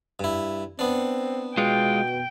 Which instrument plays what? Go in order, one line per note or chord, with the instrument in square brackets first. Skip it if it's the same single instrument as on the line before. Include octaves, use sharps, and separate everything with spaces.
[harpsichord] G2 E4
[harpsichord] B3 D4 [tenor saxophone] C4
[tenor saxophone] B2 [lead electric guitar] G#3 F4 [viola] G5